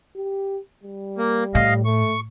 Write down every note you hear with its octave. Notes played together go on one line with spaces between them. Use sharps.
G4
G3
A#3
A2 D#5 F5
A3 C#6